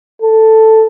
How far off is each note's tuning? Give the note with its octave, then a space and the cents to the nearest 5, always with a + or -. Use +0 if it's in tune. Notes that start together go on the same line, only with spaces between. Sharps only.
A4 +5